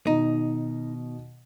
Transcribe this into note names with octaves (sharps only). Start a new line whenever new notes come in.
B2 D#3 D#4